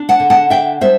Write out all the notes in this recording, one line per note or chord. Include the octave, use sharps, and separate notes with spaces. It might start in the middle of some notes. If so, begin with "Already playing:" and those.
Already playing: D4
F#5 A5
D3
F#5 A5
D4 E5 G5
G3 C5 E5